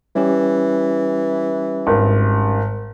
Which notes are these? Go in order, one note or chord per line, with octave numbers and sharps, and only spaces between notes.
E3 G3 C#4 G4
G#1